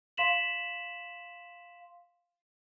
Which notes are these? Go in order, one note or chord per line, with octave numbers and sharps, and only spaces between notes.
F5 C6 B6 E7 F#7